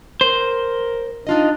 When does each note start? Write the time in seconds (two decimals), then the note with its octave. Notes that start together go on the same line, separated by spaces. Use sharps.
0.21 A#4 C5
1.27 D4 D#4 F4 D#5